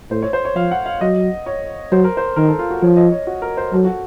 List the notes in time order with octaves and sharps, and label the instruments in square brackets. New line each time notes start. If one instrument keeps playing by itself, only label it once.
[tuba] A2 [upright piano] C5
[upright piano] C#5
C5
C#5
[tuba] F3 [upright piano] F5
[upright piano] F#5
F5
[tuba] F#3 [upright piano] D#5
[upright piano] C#5
[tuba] F#3 [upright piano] C5
[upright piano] A#4
C5
[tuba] D#3 [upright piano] A#4
[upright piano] A4
F4
F#4
[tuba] F3 [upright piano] C#5
[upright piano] D#5
C#5
F#4
A#4
C5
[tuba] F#3 [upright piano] A4
[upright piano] F#4